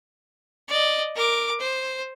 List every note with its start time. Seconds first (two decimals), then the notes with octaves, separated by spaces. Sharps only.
0.68 D5 D#5
1.16 A#4 D6
1.60 C5